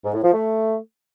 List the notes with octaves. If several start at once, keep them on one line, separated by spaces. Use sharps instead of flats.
G#2
A2
F3
A3